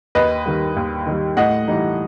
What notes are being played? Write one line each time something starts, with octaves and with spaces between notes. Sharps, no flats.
D#2 B4 D#5
D#3 G3
D#2
D#3 G3
A2 D#5 F#5
E3 G3 D#4